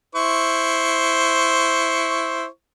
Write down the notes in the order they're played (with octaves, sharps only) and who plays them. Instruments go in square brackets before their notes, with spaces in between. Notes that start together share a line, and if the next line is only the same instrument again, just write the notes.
[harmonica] E4 C5 C#6